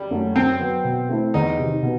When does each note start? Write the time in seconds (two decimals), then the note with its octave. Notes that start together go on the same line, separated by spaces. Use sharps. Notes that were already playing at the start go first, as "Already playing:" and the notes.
Already playing: G3
0.11 F#2 F#3 A3
0.36 F#2 C4
0.59 F#3 B3
0.84 B2
1.09 A3 C4 E4
1.34 E2 D#4
1.59 C3 D#3
1.83 B2